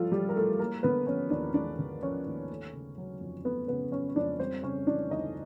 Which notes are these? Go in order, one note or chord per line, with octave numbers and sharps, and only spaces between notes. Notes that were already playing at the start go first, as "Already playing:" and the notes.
Already playing: A2 F3 G3 A3 F4 A4
G3 G#3 G4
A#4
A2 A3 A4
G#3 A#3 A#4
D3 B3 B4
F3 C#4 C#5
D#2 D4 D5
G#3 D4 D5
D3
F3 C#4 C#5
D#2
A3
C#3
F#3
F2
A3 B3 B4
C#3 B3 B4
F#3 C#4 C#5
C#5
F2 D4 D5
G3 C4 C5
C#3 C#4 C#5
E3 D4 D5
D2 D#4 D#5